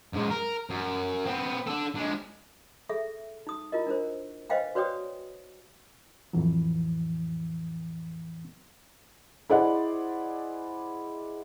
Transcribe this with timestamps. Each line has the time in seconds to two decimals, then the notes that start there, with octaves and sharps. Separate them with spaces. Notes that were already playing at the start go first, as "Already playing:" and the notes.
0.13 F#2 G#3
0.30 A#4
0.70 F#2
1.25 B3 C4
1.67 D4 A4
1.95 D3 G#3
2.89 G#4 A4 E5
3.47 D#4 D#6
3.72 E4 F4 A#4 D#5
3.87 D4 A#4 C5
4.50 B4 C5 D#5 F5 G5 G#5
4.75 F#4 B4 C#5 D5 G5 D#6
6.33 F2 A2 E3 F#3
9.50 E4 G#4 C5 D5 D#5 F#5